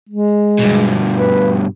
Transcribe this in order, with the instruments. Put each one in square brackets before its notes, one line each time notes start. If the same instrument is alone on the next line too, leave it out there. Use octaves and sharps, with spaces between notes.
[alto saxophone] G#3
[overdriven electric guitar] G2 B2
[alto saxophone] B4